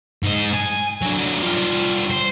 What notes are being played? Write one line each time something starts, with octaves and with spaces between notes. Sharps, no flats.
G#2 D#5
G#5
D3 F#3
G3 F4
C5